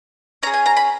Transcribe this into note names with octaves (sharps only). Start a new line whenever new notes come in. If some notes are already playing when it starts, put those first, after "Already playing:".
C#4 G#4 A#5
G#5
A#5
B5